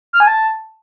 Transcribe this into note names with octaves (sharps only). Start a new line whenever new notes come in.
F6
G#5
A5